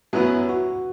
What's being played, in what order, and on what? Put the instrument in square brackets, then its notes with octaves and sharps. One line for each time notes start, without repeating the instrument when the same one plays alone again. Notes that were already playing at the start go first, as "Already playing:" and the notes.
[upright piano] F#2 F#3 B3 E4 B4 [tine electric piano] F#4
[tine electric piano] F#4